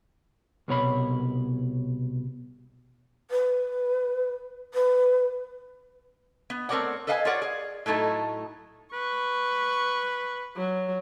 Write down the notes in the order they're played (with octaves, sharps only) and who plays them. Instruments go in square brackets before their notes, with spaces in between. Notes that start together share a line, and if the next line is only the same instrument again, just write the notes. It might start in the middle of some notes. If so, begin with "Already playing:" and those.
[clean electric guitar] C2 B2 C#5 B5
[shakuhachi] B4
B4
[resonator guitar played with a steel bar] B3
A3 C4 A#4 C#5 D5 F#5
A4 B4 D#5 F5 F#5 G#5
F4 G#4 A#4 C#5 D5 F#5
G#4
A2 F#3 A3 D#4 A4
[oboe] B4 [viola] C#6
[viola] F#3